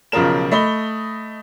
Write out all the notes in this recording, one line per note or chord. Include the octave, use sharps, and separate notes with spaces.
B1 C#3 F3 F4 A#4 E7
A3 D#5 B5 G7